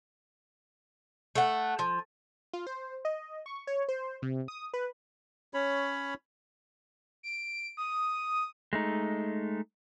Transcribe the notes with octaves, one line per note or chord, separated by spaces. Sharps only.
A3 F#5
F3
F4
C5
D#5
C#6
C#5
C5
C3
D#6
B4
C#4 C#5 B5
D7
D#6
G#3 A3 D#4